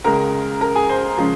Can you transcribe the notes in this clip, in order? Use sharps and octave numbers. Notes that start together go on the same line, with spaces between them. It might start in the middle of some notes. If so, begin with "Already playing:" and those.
C#2 C#3 G#3 A#4 A#5
A#4 A#5
G#4 G#5
C5 C6
C#3 F3 G#3 C#4 F4